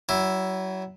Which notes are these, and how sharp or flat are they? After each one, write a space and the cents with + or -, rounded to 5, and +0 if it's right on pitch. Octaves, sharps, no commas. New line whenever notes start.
F#3 +30 E4 +0